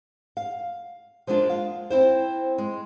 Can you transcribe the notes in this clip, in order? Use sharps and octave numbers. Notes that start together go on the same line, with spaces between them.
F5
F3 G#3 A#3 D4 F4
F5
C4 E4 C5
G#3